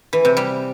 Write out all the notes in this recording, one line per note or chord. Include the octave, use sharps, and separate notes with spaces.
E3
C3
G3